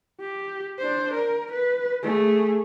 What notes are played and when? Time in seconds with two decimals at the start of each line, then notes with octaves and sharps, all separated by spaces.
0.21 G4
0.79 D4 C5
1.14 A#4
1.52 B4
2.03 A3 G#4